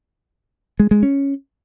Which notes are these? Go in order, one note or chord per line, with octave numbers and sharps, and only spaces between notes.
G#3
G#3
C#4